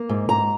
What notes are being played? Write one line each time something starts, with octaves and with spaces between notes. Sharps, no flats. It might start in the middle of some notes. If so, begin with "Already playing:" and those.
Already playing: A#3
G#2
G#2 A#5